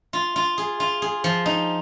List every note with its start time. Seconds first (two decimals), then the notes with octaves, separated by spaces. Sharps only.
0.13 F4
0.36 F4
0.58 G#4
0.80 F4
1.02 G#4
1.24 F3
1.46 D#4